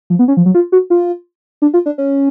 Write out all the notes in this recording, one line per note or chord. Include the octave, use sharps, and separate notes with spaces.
F3
B3
C#4
F3
F#3
F4
F#4
F4
D4
F4
D4
C#4